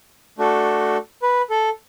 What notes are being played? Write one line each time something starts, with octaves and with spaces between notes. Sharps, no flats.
A3 D4 F#4 A4
B4
A4